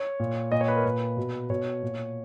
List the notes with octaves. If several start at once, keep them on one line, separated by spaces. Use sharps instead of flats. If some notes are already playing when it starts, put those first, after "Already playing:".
Already playing: C#5
A#2
A#2 D#5
C#5
B4
A#4
A#2 B4
B2
B2 C#5
A#2